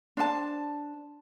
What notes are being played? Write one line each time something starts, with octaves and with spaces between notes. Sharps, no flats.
D4 C5 D5 A5